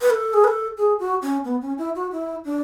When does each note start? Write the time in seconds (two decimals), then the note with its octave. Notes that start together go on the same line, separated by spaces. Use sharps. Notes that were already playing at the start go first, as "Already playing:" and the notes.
0.01 B4
0.10 A4
0.34 G#4
0.44 B4
0.48 A4
0.78 G#4
1.00 F#4
1.22 C#4
1.45 B3
1.62 C#4
1.78 E4
1.96 F#4
2.12 E4
2.45 D4